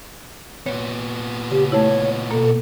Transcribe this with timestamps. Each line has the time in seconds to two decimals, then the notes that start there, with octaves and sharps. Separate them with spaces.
0.66 A#2 B3 C#5
1.51 C#3 G4
1.72 A3 E4 C#5
2.31 B2 A#3 A4